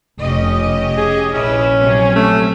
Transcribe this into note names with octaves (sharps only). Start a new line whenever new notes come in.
F1 C#4 G4 D#5
G#4
A#1 C#4 E4 B4
C3 F#3
A3